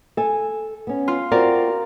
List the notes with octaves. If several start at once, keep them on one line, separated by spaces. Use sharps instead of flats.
A4 G#5
B3 C#4
F4
C4 F4 F#4 A#4 D5